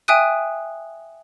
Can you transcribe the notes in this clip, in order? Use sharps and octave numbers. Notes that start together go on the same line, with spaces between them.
E5 G5 G#5 D#6 F#6 D#7